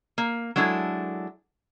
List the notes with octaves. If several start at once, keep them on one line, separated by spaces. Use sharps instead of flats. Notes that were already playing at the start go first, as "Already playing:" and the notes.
A#3
F#3 G#3 D4 E4 A4